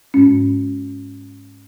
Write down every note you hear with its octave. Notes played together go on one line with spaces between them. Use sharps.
G#2 G#3 C#4